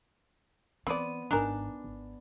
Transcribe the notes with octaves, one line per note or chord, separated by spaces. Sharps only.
E3 B3 C4 D5 D#7
G#1 D4 D#4 A#4 G#5 A#5 F#6
G#1